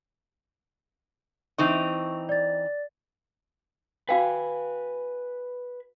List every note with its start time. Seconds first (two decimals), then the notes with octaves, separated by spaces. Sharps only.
1.58 E3 C4 D#4 C#6
2.29 D5 A6
4.09 F#4 B4 F5 G5 G#5